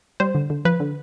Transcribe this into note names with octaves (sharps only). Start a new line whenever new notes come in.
G3 C5
D3
D3
F3 B4
D3